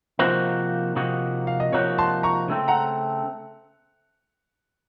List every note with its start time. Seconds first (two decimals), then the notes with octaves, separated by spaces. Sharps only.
0.19 C3 F3 A#3 D#4 F#4 C5
0.96 C3 F3 A#3 D#4 F#4
1.47 F5
1.60 D#5
1.72 C3 F3 A#3 D#4 F#4 C#5
1.98 A5 C6
2.23 A#5 C#6
2.48 C#3 A3 C4
2.68 F#5 A#5